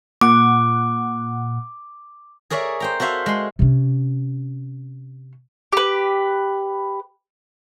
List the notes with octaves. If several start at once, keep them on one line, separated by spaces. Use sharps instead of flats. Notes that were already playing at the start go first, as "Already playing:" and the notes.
A#2 F#5 D6
G#4 A#4 C#5 D5 E5
C5 G5 A#5
F#4 A4 C5 E5 F5
G#3 C6
C3 C#4
G4 B4